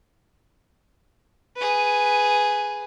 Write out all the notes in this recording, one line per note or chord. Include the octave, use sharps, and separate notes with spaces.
G#4 B4